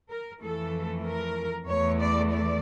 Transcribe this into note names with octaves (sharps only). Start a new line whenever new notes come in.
A#4
F2 E3 A3 A4
A#4
E2 E3 A3 C#5
D5
D5